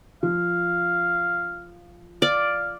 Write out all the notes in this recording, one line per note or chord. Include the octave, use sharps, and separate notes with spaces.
F3 F5
D5 F5